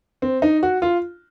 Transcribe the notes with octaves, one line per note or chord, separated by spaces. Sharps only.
C4
D#4
F#4
F4